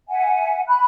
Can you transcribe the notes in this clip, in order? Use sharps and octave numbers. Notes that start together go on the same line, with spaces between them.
E5 F#5 G#5
B5 F#6